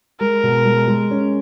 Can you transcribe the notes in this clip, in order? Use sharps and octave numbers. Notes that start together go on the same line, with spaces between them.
G#3 A#4
B2
G#3
G#3
C#4